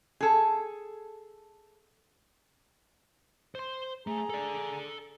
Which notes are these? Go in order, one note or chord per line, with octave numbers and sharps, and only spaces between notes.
G#4 A4
C5 C6
A3 G#4 A#5
A4 D5